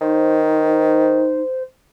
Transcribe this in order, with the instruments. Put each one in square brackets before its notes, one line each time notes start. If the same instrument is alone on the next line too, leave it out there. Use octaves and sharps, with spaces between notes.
[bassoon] D#3 [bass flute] D#4 [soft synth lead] C5